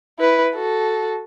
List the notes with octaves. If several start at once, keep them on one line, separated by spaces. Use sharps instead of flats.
E4 B4
F#4 A4